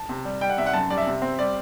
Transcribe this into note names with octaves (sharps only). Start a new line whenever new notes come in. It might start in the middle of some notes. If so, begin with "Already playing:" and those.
Already playing: A5
C3
G3
G3 G5
F#5
C3 E5
F#5
F#2 A5
G3 D5
E5
C3
C4
G3 D5